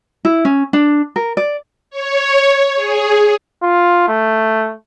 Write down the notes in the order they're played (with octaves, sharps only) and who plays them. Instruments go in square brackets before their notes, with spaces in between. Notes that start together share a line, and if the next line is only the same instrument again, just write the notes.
[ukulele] E4
C#4
D4
A#4
D5
[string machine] C#5
G#4
[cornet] F4
A3